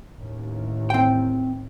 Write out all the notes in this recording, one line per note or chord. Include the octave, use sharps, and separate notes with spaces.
A1 D#2
C4 G5